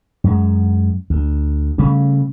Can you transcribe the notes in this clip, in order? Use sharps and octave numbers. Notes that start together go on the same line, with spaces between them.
F#2 G#3
D2
C#3 G3 A3 C#4